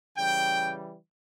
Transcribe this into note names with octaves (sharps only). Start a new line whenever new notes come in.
C#3 E3 G3 G5